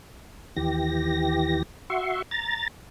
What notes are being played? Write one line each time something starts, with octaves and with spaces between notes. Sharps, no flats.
D#2 E3 G4 A#6
F#4 E5 C6 C#6
A#5 A6